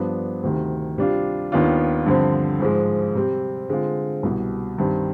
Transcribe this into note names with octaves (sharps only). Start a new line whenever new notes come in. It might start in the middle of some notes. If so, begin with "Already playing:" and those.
Already playing: G2 F3 B3 D4
D2 C3 D#3
C3 G3 D4 F4
D#2 D#3 B3 D4 F4
G2 D3 F3 C4
G#2 F3 G#3
C3 G3 C4
D3 G#3 C4 F4
C2 B2 G3
G2 D#3 G3 C4